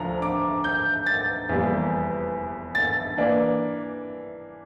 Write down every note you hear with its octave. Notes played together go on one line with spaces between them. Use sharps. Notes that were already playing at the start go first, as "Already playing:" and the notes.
Already playing: D2 D3 F3 A#5
D6
G6
A6
F1 E2 E3 G3 A#3
A6
E3 A#3 D4